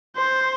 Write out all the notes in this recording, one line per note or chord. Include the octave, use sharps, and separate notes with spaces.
C5